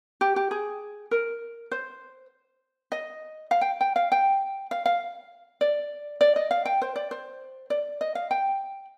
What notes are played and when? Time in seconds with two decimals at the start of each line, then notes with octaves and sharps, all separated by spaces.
0.21 G4
0.36 G4
0.51 G#4
1.11 A#4
1.71 C5
2.92 D#5
3.51 F5
3.61 G5
3.81 G5
3.96 F5
4.12 G5
4.71 F5
4.86 F5
5.61 D5
6.21 D5
6.36 D#5
6.51 F5
6.65 G5
6.82 C5
6.96 D5
7.11 C5
7.70 D5
8.01 D#5
8.15 F5
8.31 G5